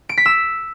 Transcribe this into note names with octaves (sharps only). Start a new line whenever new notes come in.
D7
B6
E6